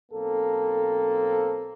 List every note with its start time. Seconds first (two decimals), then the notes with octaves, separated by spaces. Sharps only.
0.12 B1 A#3 C4 A4